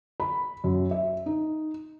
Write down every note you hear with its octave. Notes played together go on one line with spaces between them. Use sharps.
B5
F#2
E5
D#4